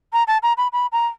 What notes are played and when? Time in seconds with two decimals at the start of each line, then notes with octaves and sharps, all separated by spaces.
0.13 A#5
0.28 A5
0.43 A#5
0.57 B5
0.73 B5
0.92 A#5